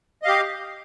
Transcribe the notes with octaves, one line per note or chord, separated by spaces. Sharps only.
G4 D#5 F5